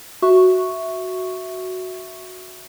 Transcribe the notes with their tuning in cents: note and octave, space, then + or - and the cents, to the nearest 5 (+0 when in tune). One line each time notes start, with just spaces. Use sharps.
F#4 +0 E5 +0 C#6 +0